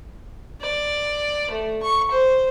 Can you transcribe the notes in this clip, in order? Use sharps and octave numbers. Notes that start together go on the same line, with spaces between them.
D5
A3
C#6
C5